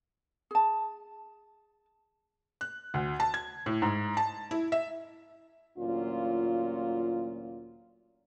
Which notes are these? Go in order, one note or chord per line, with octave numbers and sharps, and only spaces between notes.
G#4 A5
F#6
D2
A5
G#6
A2
G#2
A5
E4
E5
D2 A#2 E3 F#3 C#4 F4